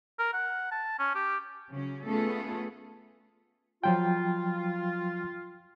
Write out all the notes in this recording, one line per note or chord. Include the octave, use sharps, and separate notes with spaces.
A#4
F#5
A5
C#4
G4
C#3 F#3 C#4
A3 B3 C#4 F4 G#4 A4
F3 F#3 F4 G5